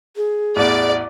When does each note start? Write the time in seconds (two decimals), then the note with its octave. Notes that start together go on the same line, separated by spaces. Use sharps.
0.16 G#4
0.56 A1 E2 D5